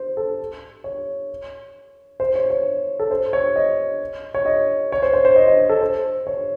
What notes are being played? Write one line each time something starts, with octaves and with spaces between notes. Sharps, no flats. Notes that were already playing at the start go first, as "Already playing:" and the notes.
Already playing: C5
A4
C#5
C5
C#5
C#5
A4
C5
C#5
D#5
C#5
D#5
C#5
C5
C5
C5
D#5
D#5
A4
C5
C#5